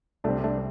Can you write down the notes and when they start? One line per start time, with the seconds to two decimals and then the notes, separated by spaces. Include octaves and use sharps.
0.24 C2 C3 G3 A3 C4 D4
0.44 A3 D4